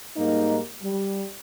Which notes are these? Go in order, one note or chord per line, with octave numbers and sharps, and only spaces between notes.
G#2 G3 A#3 D#4 D#5
G3